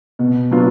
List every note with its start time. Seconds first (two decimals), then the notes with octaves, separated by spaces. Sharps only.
0.19 B2
0.51 F#3 B3 D4 F4